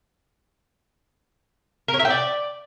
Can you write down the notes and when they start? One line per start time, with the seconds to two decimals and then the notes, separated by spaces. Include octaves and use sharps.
1.88 A#4
1.94 C#5
1.99 E5
2.05 G5
2.10 D5